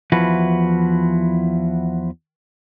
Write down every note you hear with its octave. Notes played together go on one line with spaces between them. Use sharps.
E2 F3 E4 F#4 B4